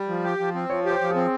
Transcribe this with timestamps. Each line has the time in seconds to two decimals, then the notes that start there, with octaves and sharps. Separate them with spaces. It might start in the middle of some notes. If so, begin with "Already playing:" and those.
Already playing: G3
0.09 F3
0.24 G4
0.40 F3
0.55 C4
0.70 F3 C#5
0.86 G4
0.91 C5
1.01 F3
1.10 G#4
1.15 C4